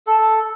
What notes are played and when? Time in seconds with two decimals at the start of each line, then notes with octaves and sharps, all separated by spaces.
0.07 A4